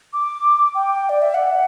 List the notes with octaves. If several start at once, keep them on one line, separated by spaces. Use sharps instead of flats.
D6
G5
D5
E5
F#5